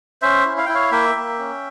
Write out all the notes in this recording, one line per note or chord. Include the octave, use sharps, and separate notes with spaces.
C#4 C5 E5
E4
F5
E4 G5
C#5 F5
A#3 E5 G5
A#3
C#4